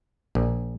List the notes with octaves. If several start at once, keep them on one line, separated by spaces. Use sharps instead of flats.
A#1